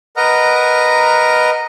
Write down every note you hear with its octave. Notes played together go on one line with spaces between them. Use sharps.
A#4 B4 D#5 F#5 A#5 F6